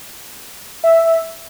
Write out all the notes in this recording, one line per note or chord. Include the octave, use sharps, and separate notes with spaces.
E5